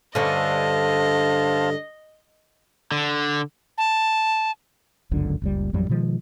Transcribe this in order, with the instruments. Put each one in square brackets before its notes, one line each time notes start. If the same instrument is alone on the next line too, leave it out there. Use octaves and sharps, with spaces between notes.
[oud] G2 D3 C#4 [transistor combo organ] C5 F5 A5 [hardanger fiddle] D#5
[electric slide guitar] D3
[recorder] A5
[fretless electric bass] G1 C#2 F#2 D3
F#1 C#2 G3
A1 F2 F#3 G3
B2 D#3 F3 G#3